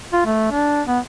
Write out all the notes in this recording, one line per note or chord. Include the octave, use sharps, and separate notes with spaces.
F4
A3
D4
B3